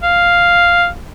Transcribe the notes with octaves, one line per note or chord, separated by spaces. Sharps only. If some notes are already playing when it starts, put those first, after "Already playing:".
F5